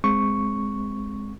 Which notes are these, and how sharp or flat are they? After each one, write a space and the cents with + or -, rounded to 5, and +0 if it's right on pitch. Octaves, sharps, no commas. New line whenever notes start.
G#3 +0 C4 +0 C#6 +0